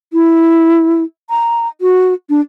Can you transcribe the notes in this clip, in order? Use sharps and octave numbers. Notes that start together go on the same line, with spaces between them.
E4
A#5
F#4
D4